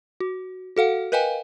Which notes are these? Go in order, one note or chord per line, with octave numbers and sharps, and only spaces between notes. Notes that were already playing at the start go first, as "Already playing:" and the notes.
F#4
F#4 A4 F5 F#5
A#4 B4 D#5 F5 G5 G#5